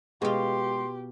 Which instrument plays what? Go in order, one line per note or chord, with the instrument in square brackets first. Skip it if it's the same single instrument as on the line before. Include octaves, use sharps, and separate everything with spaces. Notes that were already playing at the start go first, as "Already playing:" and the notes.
[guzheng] B2 F4 [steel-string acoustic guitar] G#3 [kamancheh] G4 [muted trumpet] C6